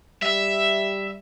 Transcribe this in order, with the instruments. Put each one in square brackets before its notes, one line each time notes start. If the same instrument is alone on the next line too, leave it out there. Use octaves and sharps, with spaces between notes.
[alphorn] G3 [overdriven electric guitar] E5